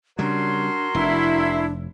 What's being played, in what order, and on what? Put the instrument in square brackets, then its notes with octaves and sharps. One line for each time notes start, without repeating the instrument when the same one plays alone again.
[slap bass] C#3 G3 [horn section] F#3 A#4 C6 [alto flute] D4
[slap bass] F1 [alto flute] D4 [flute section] E4